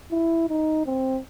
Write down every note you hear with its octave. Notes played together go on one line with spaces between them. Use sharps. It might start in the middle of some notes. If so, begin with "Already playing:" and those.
E4
D#4
C4